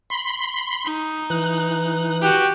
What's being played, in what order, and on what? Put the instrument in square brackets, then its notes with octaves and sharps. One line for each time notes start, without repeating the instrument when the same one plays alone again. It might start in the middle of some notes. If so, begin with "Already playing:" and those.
[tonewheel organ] B5 C6
[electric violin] D#4
[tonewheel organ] E3 F#6
[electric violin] F#4 G4